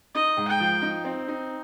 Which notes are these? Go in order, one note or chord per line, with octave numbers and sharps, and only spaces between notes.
D#4 D#5
G#2
G5
F3
D#4
C4
D#4